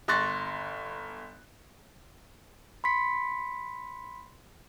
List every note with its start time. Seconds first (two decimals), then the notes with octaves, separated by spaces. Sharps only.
0.08 G1 C6 C#6 F#6 A6 A#6
2.84 B5 C6 B6 C#7